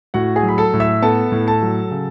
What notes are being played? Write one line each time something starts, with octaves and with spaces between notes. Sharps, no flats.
A2 F#4 F#5
G#4 G#5
F#3
B5
A4 A5
A2
E5 E6
B3 A4 A5
A2
A4 A5
F#3
C#3